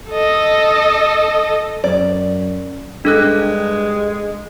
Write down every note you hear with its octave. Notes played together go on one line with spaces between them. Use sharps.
A4 D#5
F#2 D5
G2 G#3 D4 A4 F#6